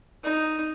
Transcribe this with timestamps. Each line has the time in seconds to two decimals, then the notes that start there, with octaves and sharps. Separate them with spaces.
0.24 D#4